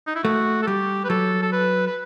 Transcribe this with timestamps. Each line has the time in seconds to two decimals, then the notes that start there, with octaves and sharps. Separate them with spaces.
0.07 D#4
0.16 E4
0.24 A3 F#4
0.63 A4
0.67 G3 G4
1.05 B4
1.09 F#3 A4
1.43 A4
1.52 B4
1.87 B4